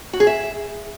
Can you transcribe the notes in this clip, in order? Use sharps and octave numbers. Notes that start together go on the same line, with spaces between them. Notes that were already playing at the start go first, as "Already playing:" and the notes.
F#4
G#4
E5